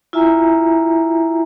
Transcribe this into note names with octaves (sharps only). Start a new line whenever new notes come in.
E4 F4 E5 G#5 A#5